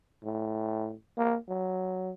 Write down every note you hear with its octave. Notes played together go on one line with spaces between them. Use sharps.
A2
A#3
F#3